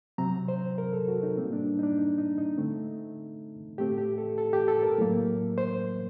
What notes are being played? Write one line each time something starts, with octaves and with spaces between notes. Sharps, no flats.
C3 F#3 C4 A#5
C5
A#4
A4
F#4
D#4
A2 G3 A#3 C4
D4
D#4
D4
D#4
D#4
D#4
D3 A3 C4
A2 A3 C4 G4
G4
A4
A4
G4
A4
A#4
A2 F#3 A#3
C5